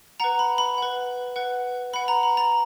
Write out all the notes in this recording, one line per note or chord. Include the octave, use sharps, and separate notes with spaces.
B4 F#5 A#5
B5
B5
B4 F#5
B4 F#5
B4 F#5 B5
A#5
B5
A#5